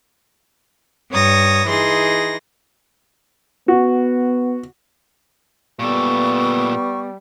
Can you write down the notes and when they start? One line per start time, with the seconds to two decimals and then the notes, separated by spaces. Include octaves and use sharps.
1.10 G2 C#5 D#6 A#6
1.67 E3 D#4 G#4 C6 A#6
3.68 B3 F#4
5.79 A#2 G3 B3 A4 C#6